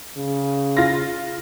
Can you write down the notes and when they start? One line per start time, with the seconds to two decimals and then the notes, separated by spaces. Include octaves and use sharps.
0.17 C#3
0.77 F4 A#6